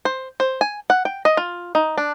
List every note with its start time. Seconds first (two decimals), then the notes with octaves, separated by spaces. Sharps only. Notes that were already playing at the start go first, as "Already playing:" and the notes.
0.05 C5
0.40 C5
0.61 G#5
0.90 F#5
1.05 G5
1.25 D#5
1.37 F4
1.75 D#4
1.98 D4